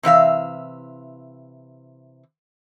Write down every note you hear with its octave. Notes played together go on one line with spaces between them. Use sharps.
C3 E3 E5 F5